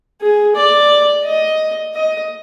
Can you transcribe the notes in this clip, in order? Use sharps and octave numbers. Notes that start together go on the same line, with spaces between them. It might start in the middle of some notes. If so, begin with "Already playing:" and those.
G#4
D5
D#5
D#5